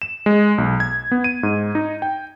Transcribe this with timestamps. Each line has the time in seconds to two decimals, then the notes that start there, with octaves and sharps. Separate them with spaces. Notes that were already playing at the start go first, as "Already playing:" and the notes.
0.02 E7
0.26 G#3
0.58 B1
0.80 G#6
1.11 B3
1.24 D#7
1.43 G#2
1.75 D#4
2.02 G5